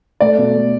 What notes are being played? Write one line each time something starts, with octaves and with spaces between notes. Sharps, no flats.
A3 D5
B2
A3